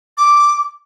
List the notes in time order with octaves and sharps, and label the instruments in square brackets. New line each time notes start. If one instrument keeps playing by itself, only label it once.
[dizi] D6